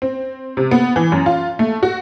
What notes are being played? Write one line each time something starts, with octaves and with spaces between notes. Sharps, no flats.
C4
C3
B3
E3
F#2
F4
A3
F#4